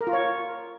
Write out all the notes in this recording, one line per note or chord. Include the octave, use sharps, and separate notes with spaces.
A#4
F4
C#5